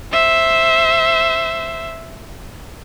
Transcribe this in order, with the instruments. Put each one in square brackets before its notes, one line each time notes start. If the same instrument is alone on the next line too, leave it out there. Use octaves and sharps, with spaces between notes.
[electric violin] C5 E5